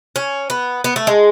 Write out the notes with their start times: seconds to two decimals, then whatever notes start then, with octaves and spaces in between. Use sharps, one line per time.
0.16 C#4
0.50 B3
0.84 B3
0.96 A3
1.07 G#3